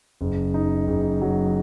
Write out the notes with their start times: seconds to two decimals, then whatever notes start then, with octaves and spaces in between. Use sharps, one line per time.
0.21 F#1
0.54 D#4
0.87 F#1
1.21 F#3